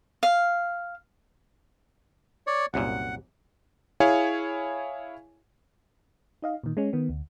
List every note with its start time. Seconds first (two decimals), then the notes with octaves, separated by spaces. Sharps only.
0.23 F5
2.47 C#5 D5
2.74 C2 F#2 A#2 F#5
4.00 E4 G#4 C#5 F5 G#5
6.42 D#4 D#5 F5
6.64 A#2 D#3
6.77 G#3 C#4
6.93 D#3 B3
7.09 D2